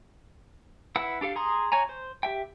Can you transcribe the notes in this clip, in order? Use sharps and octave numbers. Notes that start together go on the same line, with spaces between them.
E4 B4 F#5 E6
D4 G4 A4 F5
G#4 A#5 C6 D#6
F#4 C#5 G#5 A#5
C5
G4 E5 G5